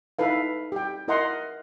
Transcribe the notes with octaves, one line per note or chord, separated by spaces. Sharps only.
D#4 E4 A4 B4 F5
G4 G5
E4 A#4 D#5 F#5 A#5 C6